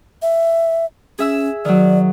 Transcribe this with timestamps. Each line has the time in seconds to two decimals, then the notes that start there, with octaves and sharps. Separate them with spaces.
0.22 E5
1.19 C#4 G#4 E5 E6
1.65 D#3 F#3 D5